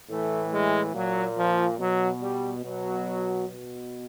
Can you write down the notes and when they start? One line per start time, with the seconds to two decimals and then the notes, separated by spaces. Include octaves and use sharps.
0.10 A2 E3 A3
0.52 G#3
0.95 A#2 F#3
1.37 F3
1.79 B2 F#3
2.22 G3
2.64 B2 F#3
3.49 B2